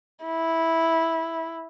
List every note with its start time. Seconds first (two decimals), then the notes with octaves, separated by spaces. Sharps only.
0.25 E4